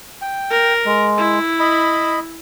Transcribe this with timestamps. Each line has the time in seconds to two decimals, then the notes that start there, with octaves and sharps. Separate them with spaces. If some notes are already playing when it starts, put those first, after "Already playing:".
0.22 G5
0.50 A#4
0.85 G#3
1.18 E4
1.60 D#5 B5